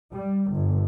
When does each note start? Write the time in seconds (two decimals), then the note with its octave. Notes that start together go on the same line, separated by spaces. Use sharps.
0.11 G3
0.51 G1